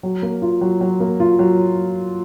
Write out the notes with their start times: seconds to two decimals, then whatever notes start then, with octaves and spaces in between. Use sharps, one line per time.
0.03 F#3
0.22 A#3
0.42 F4
0.61 F#3
0.81 F#3
1.00 A#3
1.20 F4
1.39 F#3